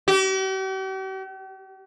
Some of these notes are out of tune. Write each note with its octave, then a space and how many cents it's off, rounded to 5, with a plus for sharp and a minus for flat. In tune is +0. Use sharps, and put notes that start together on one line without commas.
G4 -45